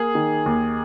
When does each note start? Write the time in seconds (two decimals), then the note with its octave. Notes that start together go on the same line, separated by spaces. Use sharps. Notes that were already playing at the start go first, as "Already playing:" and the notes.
Already playing: A#3 G#4
0.15 D#3
0.46 D#2